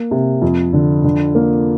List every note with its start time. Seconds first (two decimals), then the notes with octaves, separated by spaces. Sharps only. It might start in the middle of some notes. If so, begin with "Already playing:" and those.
Already playing: A#3
0.11 C3
0.42 F2
0.73 D3
1.04 D3
1.35 A#3